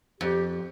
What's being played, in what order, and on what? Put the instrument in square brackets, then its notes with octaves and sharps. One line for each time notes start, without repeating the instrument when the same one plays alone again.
[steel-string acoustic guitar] F2 [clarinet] G4